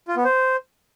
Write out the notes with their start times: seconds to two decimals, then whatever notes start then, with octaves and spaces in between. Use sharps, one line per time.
0.08 F4
0.16 B3
0.25 C5